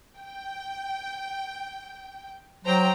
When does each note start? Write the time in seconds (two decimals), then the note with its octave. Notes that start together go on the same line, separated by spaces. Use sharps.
0.17 G5
2.65 F#3 C5 G5 A#5